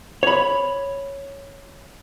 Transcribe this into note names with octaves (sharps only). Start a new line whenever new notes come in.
C#5 B5